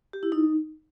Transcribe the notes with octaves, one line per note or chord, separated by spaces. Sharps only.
G4
E4
D#4